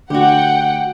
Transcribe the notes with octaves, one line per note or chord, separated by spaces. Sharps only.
D3 A3 F#4 G4 F#5 G5